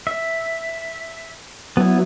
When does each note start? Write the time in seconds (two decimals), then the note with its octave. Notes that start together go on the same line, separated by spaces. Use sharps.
0.07 E5
1.77 F#3 B3 E4